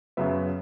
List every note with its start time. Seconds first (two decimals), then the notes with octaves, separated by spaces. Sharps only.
0.17 F#2 C#3 F#3 B3 E5